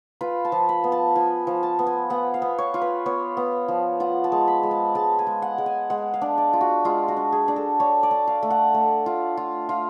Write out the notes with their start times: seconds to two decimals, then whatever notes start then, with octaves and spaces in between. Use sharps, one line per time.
0.21 F4 B4
0.45 A5
0.52 F3
0.69 B5
0.84 B3
0.92 A5
1.15 F3 G#5
1.47 F3
1.63 A5
1.79 B3
1.87 G#5
2.10 B3 F#5
2.34 F5
2.42 B3
2.58 C#5
2.74 F4
2.81 B4
3.06 B3 C#5
3.37 B3
3.68 F3
4.00 F4 F#5
4.24 A5
4.32 G#3
4.48 B5
4.63 G#3
4.71 A5
4.95 G#3 A5
5.19 G#5
5.27 G#3
5.42 F#5
5.58 G#3
5.66 G#5
5.90 G#3 F#5
6.14 F5
6.22 D4
6.38 D5
6.53 F4
6.61 F#4
6.85 G#3 F4
7.08 F#4
7.17 D4
7.32 G#4
7.48 D4
7.56 A4
7.80 D4 C#5
8.03 D5
8.11 D4
8.27 F5
8.43 A3
8.50 F#5
8.74 A3
9.06 F4
9.37 F4
9.69 F4